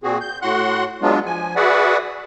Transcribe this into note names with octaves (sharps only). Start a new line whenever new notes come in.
A#2 C4 F#4 G#4
G6
A2 F#4 F#5 C6 F#6
F#3 G#3 B3 D4 F4
F3 G#5
F#4 G#4 B4 D5 E5 F#5